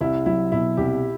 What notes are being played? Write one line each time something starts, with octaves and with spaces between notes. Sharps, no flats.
C2 E4
F#3 E4
B2 E4
C2 G4